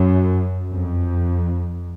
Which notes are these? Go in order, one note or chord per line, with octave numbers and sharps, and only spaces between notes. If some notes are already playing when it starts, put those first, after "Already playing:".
Already playing: F#2
F2